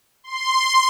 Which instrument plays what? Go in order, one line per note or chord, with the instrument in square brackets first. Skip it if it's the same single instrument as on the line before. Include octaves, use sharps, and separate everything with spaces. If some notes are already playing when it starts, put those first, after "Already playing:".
[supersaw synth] C6